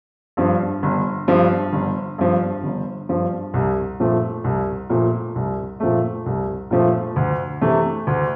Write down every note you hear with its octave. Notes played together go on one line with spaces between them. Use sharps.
G2 F3
G1
G2 F3
G1
G2 F3
G1
G2 F3
C2
A#2 F3 A3
C2
A#2 F3 A3
C2
A#2 F3 A3
C2
A#2 F3 A3
D2
C3 E3 A3
D2